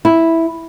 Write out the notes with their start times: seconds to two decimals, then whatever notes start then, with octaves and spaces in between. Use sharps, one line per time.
0.05 E4